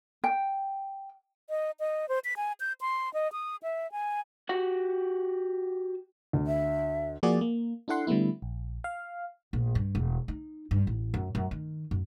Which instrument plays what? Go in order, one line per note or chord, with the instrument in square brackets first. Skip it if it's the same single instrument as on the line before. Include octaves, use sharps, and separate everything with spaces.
[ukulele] G5
[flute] D#5
D#5
C5
B6
G#5
G6
C6
D#5
D#6
E5
G#5
[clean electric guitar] F#4 G4 F#5
[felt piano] D2
[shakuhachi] E5
[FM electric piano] F3 A#3 F#4 G#4 D5
A#3
D4 E4 A4 F#5 C6
D3 G3 A3 B3 E4
A#1
F5
[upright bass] A#1
G2
E1
D#4
G2
A1
F#2
F#2
D#3
F#2